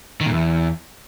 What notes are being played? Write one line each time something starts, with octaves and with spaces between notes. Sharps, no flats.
D#3
A#2
E2